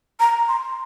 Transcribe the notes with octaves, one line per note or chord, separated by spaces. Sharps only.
A#5
C6